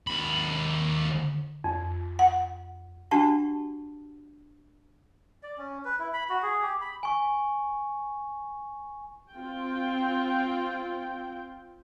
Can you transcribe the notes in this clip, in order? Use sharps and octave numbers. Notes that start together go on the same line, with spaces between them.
D#2 B5
F2
F#5
D4 F#4 G4 F#5 A5 C#6
D5
C#4
B4
E4
B5
F#4
G#4
G4
B5
G#5 C#6
C4 F4 G5